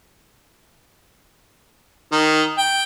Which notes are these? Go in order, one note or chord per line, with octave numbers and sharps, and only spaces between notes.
D#3
G5